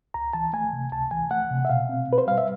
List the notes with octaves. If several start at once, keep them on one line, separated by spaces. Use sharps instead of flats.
C#2 A#5
E3 A5
A3 G#5
C3
C#2 A5
E3 G#5
A3 F#5
C3
E5
B2 F5
C4
B2 B4
C5
G3 F5
E5